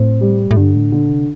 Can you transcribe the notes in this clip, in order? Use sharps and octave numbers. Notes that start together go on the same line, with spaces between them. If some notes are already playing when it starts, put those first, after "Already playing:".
Already playing: A2 C4
G3
A2
G2 D3
A2
A#2 D3
C3